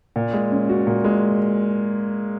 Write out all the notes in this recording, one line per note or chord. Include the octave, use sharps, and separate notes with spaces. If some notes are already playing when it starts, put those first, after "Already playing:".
A#2
G#3
C#4
F#4
A#2
G#3